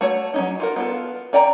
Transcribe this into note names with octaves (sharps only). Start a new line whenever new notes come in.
A3 F#4 C#5
F#3 C#4 D#4
F4 F#4 A#4
B3 F4 A4
C#4 D5 G5 A#5